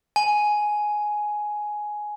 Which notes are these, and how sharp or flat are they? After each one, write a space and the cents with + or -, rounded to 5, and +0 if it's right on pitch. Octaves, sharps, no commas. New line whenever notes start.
G#5 +10